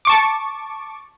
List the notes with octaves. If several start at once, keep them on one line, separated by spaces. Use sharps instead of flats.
A5 C#6 D6